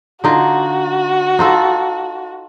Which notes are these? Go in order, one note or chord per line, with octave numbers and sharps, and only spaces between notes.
D3 D#4 F4 F#4
D#4 F4 A4